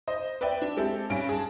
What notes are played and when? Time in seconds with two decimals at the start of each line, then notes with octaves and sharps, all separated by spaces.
0.08 C5 D#5
0.41 B4 D5 E5 G5
0.62 D4
0.77 G#3 C4 E4 G4 A4
1.10 G2 C#4 D7
1.29 G#4 A5